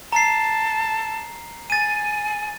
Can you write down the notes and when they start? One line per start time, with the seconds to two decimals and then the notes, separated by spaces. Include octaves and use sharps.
0.13 A5 A#5 C7
1.70 G#5 A6 D#7